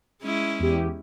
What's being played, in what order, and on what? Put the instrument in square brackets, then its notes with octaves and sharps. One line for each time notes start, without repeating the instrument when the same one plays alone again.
[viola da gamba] G#3 C#4 E4
[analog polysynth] E2 G4